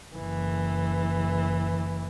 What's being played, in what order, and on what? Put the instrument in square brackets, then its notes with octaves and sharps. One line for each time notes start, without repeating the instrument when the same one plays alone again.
[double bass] F#1 E3